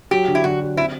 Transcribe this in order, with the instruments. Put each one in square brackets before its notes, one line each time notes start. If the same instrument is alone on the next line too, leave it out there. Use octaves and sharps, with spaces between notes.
[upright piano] F#3 [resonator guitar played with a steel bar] G4
[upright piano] D3
[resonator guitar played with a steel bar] E4
[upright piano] D3 [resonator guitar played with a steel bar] F#4
[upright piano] F#3
[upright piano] C4 [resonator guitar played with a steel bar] E4